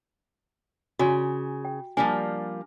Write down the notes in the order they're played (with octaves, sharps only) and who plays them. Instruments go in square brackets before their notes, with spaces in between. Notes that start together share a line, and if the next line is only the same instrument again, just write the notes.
[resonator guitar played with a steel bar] C#3 [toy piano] F#4 G#5 C6
[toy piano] G5
[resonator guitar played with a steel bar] F3 G3 A#3 [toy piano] D4 G#5